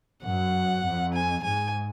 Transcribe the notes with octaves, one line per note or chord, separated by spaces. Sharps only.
F#2 F#5
F2
G#5
G#2 G#5